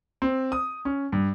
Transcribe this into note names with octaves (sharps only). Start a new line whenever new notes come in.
C4
D#6
C#4
G2